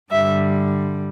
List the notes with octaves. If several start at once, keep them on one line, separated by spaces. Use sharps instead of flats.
G2 D3 G3 E5